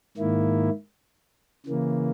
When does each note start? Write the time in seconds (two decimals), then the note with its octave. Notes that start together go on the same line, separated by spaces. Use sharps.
0.17 G#2 D#3 A#3 E4
1.66 C#3 E3 A#3